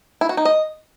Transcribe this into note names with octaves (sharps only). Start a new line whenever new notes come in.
E4
F#4
D#4
D#5